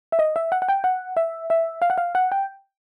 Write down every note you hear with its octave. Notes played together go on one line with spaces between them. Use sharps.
E5
D#5
E5
F#5
F#5
G5
F#5
E5
E5
F5
F#5
F5
F#5
G5